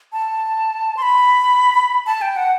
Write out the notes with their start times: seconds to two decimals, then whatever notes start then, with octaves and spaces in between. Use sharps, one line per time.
0.13 A5
0.97 C6
1.02 B5
2.06 A5
2.22 G5
2.36 F#5